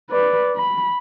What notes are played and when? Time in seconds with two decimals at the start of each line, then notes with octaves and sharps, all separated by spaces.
0.11 B4 D5
0.57 B5